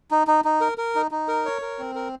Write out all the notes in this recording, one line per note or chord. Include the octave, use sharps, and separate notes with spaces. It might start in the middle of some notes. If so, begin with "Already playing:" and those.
D#4
D#4
D#4
A#4
A#4
D#4
D#4
A#4
C#5
A#4
C4
A#4